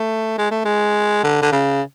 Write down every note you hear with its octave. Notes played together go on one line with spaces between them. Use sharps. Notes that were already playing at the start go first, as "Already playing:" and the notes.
Already playing: A3
G#3
A3
G#3
D3
D3
C#3